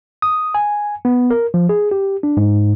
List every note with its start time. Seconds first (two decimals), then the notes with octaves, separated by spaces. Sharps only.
0.22 D#6
0.55 G#5
1.05 B3
1.31 A#4
1.54 F3
1.69 G#4
1.91 G4
2.23 D4
2.37 G#2